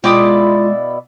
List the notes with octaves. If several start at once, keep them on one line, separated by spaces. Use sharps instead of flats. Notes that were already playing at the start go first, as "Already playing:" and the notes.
B2 G#3 E4 F4 D5 G5 D6 D#6